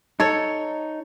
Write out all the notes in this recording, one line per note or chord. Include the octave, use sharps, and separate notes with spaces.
D#4 A4 C#5